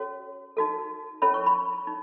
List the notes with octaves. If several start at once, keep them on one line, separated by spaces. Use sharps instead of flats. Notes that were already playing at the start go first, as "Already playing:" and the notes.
Already playing: C#4 F#4 A4 C#5
D#4 F#4 A4
C#4 E4 A4 C#5 B5
C#6
B5
D#4